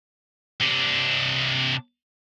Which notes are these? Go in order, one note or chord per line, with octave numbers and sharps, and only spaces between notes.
C3 D4